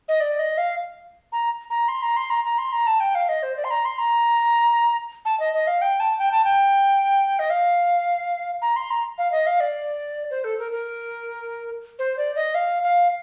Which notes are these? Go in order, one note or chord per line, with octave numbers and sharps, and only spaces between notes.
D#5
D5
D#5
F5
A#5
A#5
C6
A#5
C6
A#5
A#5
C6
A#5
A5
G5
F5
D#5
C5
D5
C6
A#5
C6
A#5
A5
D#5
D#5
F5
G5
A5
G5
A5
G5
D#5
F5
A#5
C6
A#5
F5
D#5
F5
D5
C5
A4
A#4
A#4
C5
D5
D#5
F5
F5